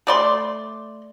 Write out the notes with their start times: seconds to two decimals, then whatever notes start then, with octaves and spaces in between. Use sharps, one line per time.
0.07 A3 D5 C6